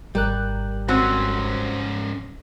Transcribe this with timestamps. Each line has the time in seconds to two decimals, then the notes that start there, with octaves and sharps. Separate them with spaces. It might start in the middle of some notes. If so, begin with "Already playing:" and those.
0.15 G#1 G3 A#4 F#6
0.88 G#2 C4 C#4 F#4 C5